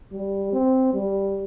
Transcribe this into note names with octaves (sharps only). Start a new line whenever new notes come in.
G3
C4
G3